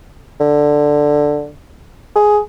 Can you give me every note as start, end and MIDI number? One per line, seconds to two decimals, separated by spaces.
0.40 1.49 50
2.16 2.39 68